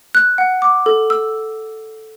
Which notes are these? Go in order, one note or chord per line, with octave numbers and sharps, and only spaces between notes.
F#6
F#5
D6
A4
E6